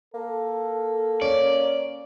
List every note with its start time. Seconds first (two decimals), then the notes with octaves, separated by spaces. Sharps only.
0.14 A#3 A4
1.22 C#4 D5